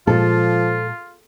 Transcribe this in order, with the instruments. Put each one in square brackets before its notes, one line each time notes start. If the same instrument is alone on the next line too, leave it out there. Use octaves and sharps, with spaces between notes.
[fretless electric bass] A#2 G#3 [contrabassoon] F3 [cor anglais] F4 [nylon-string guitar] A4